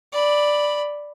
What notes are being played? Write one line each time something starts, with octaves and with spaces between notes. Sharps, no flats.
D5 B5